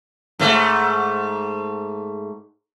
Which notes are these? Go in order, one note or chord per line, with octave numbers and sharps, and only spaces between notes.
G#2 A3